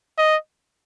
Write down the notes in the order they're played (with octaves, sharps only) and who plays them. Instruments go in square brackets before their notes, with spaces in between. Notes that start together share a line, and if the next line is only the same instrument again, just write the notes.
[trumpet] D#5